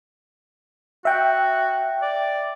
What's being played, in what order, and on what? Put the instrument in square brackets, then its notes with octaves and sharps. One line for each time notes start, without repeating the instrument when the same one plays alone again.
[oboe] F#4 [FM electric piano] E5 G5
[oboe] D5